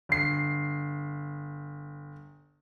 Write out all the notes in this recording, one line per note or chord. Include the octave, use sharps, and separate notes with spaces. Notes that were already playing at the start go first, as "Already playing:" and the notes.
G1 C7